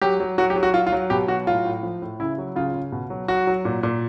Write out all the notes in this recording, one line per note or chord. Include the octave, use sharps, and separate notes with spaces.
F#3 G4
F#3
F#3 F#4
G4
F#3
F#4
F#3 F4
F4
F#3
B2 G4
F#3 F#4
A2 F4
A2
F3
A2
C#3 E4
F#3
C#3 F4
C#3
B2
F#3
F#3 F#4
F#3
A#2
A#2